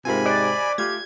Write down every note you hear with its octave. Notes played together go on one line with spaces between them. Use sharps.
G#2 C3 C4 F4 A#4 G#5 B5
C5 D5 D#5 F#6
A3 F4 G4 F6 G#6